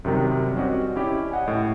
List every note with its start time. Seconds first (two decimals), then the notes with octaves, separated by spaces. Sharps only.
0.05 F#2 C3 D#3 G3
0.56 C4 C#4 F#4 D5 D#5
0.96 C#4 E4 G4 D5
1.31 D#5 F#5 G#5
1.48 A2